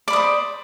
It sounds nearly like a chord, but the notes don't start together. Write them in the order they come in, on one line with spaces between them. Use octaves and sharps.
D5 B5 D#6 C5